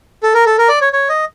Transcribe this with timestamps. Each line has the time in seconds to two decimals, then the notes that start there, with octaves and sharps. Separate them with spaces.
0.23 A4
0.34 A#4
0.46 A4
0.58 A#4
0.69 D5
0.81 C#5
0.93 C#5
1.09 D#5